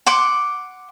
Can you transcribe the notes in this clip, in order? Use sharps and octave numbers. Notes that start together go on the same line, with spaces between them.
F#5 C6 D6